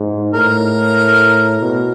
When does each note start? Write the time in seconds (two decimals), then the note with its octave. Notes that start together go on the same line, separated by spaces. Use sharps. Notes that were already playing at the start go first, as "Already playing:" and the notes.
Already playing: G#2
0.34 A2 A#4
1.61 B2